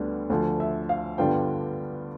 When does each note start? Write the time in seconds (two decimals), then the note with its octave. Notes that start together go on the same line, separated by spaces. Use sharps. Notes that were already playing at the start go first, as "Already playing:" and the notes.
Already playing: D2 D3 G3 B3 D4
0.30 D2 D3 F3
0.60 E5
0.89 F5
1.18 G2 D3 G3 B3 F4 G5